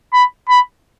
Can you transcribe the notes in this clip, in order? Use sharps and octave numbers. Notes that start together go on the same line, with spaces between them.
B5
B5